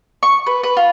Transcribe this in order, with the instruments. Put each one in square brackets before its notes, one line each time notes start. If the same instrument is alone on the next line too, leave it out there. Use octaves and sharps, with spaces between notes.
[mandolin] C#6
B4
B4
F4